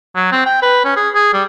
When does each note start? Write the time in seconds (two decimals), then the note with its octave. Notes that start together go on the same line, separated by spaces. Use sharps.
0.16 F#3
0.32 C4
0.46 G5
0.62 B4
0.85 C#4
0.96 G#4
1.15 G#4
1.34 G3